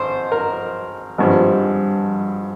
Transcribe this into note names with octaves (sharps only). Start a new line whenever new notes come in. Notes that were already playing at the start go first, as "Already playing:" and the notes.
Already playing: G#1 C5
A#4
G#1 G2 F3